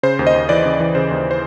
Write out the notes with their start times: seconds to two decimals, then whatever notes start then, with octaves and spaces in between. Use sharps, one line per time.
0.03 C#3 C5
0.19 D#2
0.27 D#5
0.35 D#2
0.49 E3 D5
0.65 C#3
0.80 E3
0.95 C#3 C5
1.11 D#2
1.31 C5